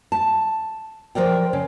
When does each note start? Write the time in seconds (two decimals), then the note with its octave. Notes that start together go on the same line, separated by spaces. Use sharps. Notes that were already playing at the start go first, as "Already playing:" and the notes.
0.12 A5
1.15 F3 A#4 D5 G5
1.53 C#3